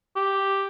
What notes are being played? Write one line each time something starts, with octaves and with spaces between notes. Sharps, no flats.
G4